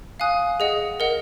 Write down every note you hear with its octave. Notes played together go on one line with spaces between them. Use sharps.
F5 G#5 D#6 F#6
G#4 D#5 F#5
A#4 D#5 F#5